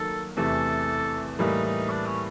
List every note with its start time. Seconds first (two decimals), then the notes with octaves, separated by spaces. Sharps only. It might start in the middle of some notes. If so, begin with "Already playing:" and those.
Already playing: D#3 F#3 A#3 D#4 A4
0.37 E2 C3 E3 A3 A4
1.39 A2 E3 G3 A#3 D#4
1.65 D#4
1.90 D4
2.06 C#4